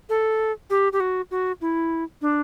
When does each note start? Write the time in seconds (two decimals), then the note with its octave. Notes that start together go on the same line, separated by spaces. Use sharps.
0.09 A4
0.70 G4
0.93 G4
1.00 F#4
1.31 F#4
1.61 E4
2.22 D4